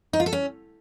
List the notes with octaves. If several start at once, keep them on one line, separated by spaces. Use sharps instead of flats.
D#4
F4
A4
C#4